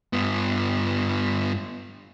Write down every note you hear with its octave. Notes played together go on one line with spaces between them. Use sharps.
G2 B3